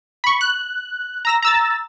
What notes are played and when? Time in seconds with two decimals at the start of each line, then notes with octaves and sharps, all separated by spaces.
0.24 B5 C#6
0.41 F#6
1.25 A#5 E6 A#6
1.42 A#5 E6 A6